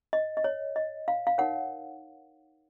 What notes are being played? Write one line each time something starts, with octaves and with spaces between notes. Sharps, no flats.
D#5
D#5
C#5
D#5
F5
F5
D#4 A#4 C#5 F#5